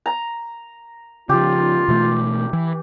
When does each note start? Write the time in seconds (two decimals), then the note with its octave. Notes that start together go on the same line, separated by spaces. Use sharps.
0.06 A#5
1.29 C#3 F3 F4 G4
1.88 B2 E3 A3
2.53 E3